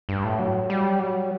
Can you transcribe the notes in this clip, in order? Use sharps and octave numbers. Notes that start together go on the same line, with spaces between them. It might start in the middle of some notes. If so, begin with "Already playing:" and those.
G2
A2
F#3
G3
F#3